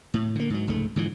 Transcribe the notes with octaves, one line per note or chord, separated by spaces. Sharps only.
A2
D3 A#3
G#2 F#3
F1 C#2 G#2 A3
G#2 D3 E3 F3